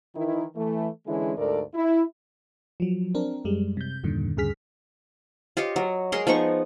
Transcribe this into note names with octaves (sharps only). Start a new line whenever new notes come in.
D#3 E3 E4
E3 A3
D3 E3 G#3 C#4 E4 G#4
D2 G#2 A4 A#4 D5
E4
F3 F#3
C4 D4 A#4
F#2 G3 G#3
C3 G6
E2 G2 A#2 D3 D#3
D2 G2 C#3 G#4 F6 B6
F4 G4 C#5 D#5
F#3
G#3 G#4 A#4 C6
F3 B3 D#4 C#6